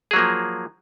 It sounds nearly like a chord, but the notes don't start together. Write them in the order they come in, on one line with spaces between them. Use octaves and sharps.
G#4 F#3 A#3 F3